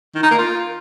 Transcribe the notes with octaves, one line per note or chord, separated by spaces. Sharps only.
D#3
D#4
A#3
F4